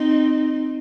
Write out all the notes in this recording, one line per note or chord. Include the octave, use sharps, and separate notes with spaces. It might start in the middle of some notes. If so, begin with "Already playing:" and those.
Already playing: C4 D#4